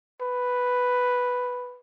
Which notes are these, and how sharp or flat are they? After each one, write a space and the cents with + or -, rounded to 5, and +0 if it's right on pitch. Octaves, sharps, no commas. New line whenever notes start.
B4 +0